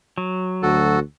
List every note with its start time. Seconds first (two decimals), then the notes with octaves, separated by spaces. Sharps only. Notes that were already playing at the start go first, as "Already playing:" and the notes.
0.18 F#3
0.63 D2 F#4 A4